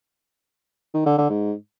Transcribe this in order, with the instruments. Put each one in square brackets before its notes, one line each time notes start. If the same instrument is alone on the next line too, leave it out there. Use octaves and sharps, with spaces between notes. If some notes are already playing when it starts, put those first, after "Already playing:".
[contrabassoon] D#3
D3
D3
G#2